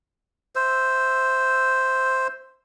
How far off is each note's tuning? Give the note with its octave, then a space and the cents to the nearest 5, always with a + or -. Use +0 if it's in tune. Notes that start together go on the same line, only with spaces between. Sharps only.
C5 +0 E5 +0 E6 +0